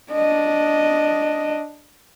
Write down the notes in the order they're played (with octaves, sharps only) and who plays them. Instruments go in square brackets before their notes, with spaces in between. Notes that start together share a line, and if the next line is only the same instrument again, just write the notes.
[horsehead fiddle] D4 D#5